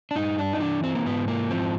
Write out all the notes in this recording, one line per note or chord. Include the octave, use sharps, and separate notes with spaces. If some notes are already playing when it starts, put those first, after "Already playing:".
D4
G2 D#4
D4
D#4
E3 D4
C4
A#3
G#2 B3
A#3
F3 C4